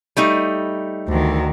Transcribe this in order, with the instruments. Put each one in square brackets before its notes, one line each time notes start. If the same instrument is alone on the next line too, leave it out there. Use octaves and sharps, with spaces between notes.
[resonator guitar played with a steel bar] G3 A3 D#4
[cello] D2 D#3